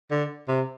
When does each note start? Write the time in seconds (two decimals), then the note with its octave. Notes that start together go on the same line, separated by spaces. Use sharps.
0.11 D3
0.48 C3